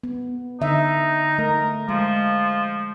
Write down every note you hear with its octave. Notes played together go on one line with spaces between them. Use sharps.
B3
D3 D#4 E5
A3 A#4
F3 G#3